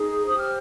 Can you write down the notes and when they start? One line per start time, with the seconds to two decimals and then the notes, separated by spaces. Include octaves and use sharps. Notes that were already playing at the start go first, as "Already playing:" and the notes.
Already playing: D#4 G#4
0.26 G4 C5 D#6
0.37 F6